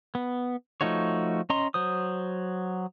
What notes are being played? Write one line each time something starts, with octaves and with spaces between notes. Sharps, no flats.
B3
F3 A3 D#4 F#4 C#5
C#4 D#5 A#5 C6
F#3 C5 D#6